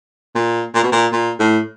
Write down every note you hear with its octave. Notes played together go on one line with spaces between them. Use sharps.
A#2
A#2
B2
A#2
A#2
A2